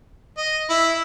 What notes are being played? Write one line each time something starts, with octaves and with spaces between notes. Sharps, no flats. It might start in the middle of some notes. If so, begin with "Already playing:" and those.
D#5
E4